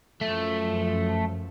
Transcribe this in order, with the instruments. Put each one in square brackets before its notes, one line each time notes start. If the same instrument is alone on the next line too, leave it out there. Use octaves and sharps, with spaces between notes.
[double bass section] F#2 F3 [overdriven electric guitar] A3